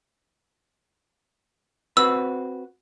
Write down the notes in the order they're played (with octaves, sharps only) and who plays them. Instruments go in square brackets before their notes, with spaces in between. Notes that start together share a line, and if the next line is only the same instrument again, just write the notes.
[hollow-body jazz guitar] C4 F#4 B4 [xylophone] E6